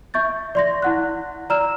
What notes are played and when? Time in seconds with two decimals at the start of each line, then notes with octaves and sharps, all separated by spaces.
0.14 E5 C#6 G6 A6
0.55 D5 C6 A#6
0.82 E4 F#5 F#6
1.50 D5 A#5 E6 F6 E7